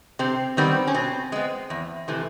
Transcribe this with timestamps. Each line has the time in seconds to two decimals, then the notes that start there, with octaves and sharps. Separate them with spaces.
0.19 C3 C4
0.57 D#3 G3 B3 C4
0.87 C#4
0.94 B2 C4
1.32 G#3 B3
1.70 E2
2.08 C3 E3 A3